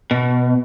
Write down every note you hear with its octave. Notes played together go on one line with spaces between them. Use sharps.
B2